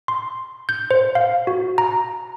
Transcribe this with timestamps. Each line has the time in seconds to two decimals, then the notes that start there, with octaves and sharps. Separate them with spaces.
0.08 C6
0.69 G6
0.91 C5
1.15 F5
1.47 F#4
1.78 A#5